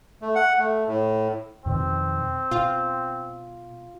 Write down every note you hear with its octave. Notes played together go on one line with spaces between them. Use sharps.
A3
F#5
A3
A2
F2 B2 D#3 C4
B2 F4